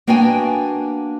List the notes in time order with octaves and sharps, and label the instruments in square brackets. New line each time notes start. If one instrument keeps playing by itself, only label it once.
[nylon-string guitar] A#3 B3 D4 F#4 G5 G#5